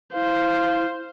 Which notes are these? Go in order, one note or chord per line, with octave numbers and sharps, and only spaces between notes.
E4 C5 F5